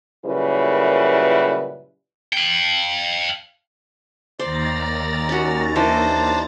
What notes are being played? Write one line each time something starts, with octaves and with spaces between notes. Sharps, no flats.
F#2 A#2 C#3 G3 E4 B4
F5 G5
D#2 C5 D5 A#5 A6
C#4 F#4
E3 D4 C5